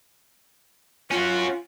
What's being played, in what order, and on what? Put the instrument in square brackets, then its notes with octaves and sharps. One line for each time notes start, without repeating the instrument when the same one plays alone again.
[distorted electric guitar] C#4 F#4 [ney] F4